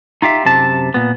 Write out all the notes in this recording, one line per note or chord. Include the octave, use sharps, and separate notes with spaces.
D#4 F4 G4 E5
F#2 C3 A5
A#2 B3